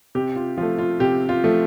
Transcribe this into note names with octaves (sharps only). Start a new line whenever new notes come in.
C3 G4
F4
F3 F4
A3
F4
C3 G4
F4
F3 A3